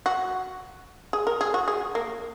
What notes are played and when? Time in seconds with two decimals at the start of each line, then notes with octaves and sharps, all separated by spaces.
0.06 F#4
1.13 G#4
1.27 A#4
1.41 G#4
1.54 F#4
1.68 G#4
1.95 A#3